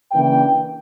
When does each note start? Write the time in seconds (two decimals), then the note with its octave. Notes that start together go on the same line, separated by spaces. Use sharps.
0.11 C#3 E3 A#3 D4 G5